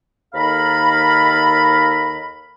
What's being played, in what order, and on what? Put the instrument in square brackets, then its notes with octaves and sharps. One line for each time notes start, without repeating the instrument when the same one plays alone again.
[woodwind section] D#2 D#3 A4 F5 A#5 B5